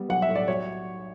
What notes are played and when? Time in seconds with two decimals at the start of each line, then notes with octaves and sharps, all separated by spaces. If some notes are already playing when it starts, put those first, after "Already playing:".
Already playing: G3 B3
0.09 B1 F#5
0.22 E5
0.29 A2
0.35 D5
0.48 F#3 C#5